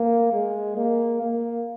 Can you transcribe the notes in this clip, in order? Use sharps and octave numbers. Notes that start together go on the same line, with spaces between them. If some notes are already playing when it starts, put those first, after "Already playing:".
Already playing: A#3
G#3
A#3
A#3